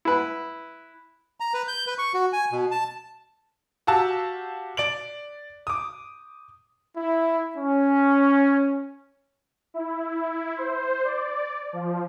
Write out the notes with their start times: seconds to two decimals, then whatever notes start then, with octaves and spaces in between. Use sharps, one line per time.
0.05 E4 B4
1.40 A#5
1.54 B4
1.68 G6
1.87 B4
1.98 C#6
2.14 F#4
2.33 G#5
2.52 B2
2.71 A5
3.87 F#4 G4 F5 A5 E6
4.77 D5 D7 F#7
5.67 D6 D#6
6.97 E4
7.56 C#4
9.74 E4
10.57 C5
11.04 D5
11.73 F3